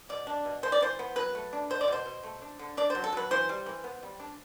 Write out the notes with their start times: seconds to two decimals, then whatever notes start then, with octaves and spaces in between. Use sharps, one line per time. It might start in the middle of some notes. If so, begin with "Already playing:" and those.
0.09 B2 D5
0.27 D4
0.45 B2
0.63 E3 C5
0.72 D5
0.81 E3 C5
0.99 B3
1.16 F#3 B4
1.35 A3
1.53 D4
1.70 B2 C5
1.81 D5
1.88 B2 C5
2.06 B2
2.23 A3
2.42 D4
2.59 D3
2.77 D4 D5
2.90 C5
2.95 F#3
3.04 A4
3.13 F#3 B4
3.31 E3 C5
3.49 G3
3.66 E3
3.84 B3
4.03 G3
4.20 D4